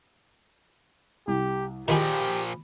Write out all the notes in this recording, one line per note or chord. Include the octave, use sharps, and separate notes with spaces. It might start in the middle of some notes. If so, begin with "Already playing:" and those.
C2 G4
A#2 D#3 F3 F4 G4 G#4 B5